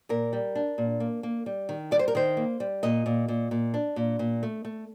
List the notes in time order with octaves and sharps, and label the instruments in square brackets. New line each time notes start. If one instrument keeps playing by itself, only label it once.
[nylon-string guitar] A#2 A#4
G3
D4
A#2
A#3
A#3
G3
D#3
G3 D5
C5
A#4
D#3 C5
A#3
G3
A#2 D#5
A#2
A#2
A#2
D4
A#2
A#2
A3
A3